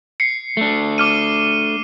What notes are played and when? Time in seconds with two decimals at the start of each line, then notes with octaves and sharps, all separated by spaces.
0.20 C7 C#7
0.57 A3 D4
0.98 D6 F6 D#7